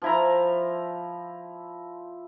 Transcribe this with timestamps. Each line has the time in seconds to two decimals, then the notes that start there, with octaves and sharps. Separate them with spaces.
0.02 F3 E4 A#5